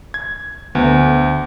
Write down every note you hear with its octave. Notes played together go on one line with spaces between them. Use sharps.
G#6
D2 B3